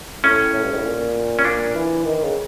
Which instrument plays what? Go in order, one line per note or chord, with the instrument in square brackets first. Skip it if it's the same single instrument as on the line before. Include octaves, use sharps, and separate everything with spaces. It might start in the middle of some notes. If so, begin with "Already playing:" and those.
[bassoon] A2 [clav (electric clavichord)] C#4
[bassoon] A2
G2
G#2
A2
A#2
[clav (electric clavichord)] C#4
[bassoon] A#2 [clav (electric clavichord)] D4
[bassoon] E3
D#3
C#3